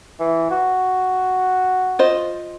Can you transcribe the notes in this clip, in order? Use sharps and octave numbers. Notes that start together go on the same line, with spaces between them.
E3
F#4
F4 C5 D#5